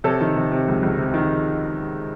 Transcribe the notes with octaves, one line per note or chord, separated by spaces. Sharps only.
C3 A4 C#5
D#3
C3
C3
C#2
C#2
C3
D#3